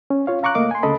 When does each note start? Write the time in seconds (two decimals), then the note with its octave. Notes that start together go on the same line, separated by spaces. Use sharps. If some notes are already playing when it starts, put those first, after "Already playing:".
0.10 C#4
0.27 F4 C#5 F5
0.43 F5 A#5 C#6 D6 F#6
0.55 C#2 A3 A#3 D#5 F5 D6
0.71 G#5 C6
0.83 D2 C#3 A4 D#5 A5 B5